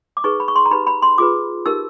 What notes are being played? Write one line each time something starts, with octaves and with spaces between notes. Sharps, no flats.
D6
D#4 G#4 B4 C#6
B5
C#6
C6
A#5
D#4 G4 B4 B5
B5
C6
F4 G#4 B4 D6
D#4 G4 A#4 E6